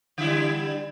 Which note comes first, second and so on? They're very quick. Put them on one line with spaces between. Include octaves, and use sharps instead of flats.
D3 E4 G3